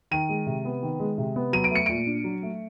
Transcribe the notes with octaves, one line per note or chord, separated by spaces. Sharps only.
D#3 D#7
G#3
C3
B3
D#3
G#3
C3
B3
F#3 D#7
D7
A3 C#7
A#2 D7
D4
F#3
A3